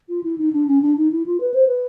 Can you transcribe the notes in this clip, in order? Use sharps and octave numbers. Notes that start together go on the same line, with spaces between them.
F4
E4
D#4
D4
C#4
D4
D#4
E4
F4
B4
C5
B4